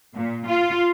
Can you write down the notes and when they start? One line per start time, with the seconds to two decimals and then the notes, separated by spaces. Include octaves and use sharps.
0.14 A#2
0.47 F4